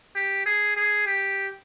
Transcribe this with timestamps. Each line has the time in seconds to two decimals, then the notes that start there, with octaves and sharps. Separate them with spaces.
0.15 G4
0.46 G#4
0.76 G#4
1.06 G4